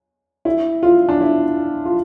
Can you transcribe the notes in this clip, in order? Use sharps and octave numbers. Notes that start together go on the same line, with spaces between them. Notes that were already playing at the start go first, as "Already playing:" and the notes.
E4
F4
D4
E4
F4